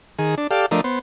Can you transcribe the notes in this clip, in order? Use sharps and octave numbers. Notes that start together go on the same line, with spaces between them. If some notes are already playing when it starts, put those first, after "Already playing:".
D#3 G#4
D4
G4 A4 D5 F5
F3 A3 D4 A#4 D#5
B3 C5